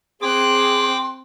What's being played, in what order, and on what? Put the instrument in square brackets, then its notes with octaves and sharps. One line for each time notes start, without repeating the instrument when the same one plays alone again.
[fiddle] C4 F#6 [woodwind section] G#4 [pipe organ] G5 D6 [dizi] C6